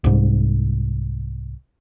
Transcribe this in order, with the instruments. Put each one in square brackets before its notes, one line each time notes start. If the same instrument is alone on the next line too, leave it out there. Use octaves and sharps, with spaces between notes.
[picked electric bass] C2 G#2